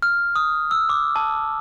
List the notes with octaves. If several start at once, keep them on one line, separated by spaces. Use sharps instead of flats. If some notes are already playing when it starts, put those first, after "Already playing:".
F6
D#6
E6
D6
A5